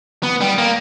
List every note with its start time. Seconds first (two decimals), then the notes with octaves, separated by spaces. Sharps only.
0.23 B3
0.41 G3
0.58 A#3